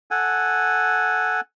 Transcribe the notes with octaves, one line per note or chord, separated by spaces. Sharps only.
A4 F#5 G#5